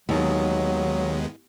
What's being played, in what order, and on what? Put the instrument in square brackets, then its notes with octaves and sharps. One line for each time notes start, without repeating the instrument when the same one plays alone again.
[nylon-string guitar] D#2 [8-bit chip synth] D#3 G#3 B3 [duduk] F#3